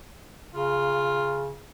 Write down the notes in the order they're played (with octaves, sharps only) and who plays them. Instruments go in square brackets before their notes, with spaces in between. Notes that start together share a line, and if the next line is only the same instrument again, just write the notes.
[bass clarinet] C#3 [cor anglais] F4